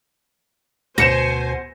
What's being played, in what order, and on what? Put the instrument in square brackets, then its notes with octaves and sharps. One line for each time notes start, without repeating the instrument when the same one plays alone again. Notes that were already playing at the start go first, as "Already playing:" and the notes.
[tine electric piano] D2 [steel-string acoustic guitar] B2 [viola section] C5 G#5 [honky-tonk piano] A#6 C#7 E7